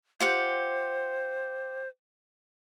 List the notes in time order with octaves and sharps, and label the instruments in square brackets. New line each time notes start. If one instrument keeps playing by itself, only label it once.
[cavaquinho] F4 G4 F#5 [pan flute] C5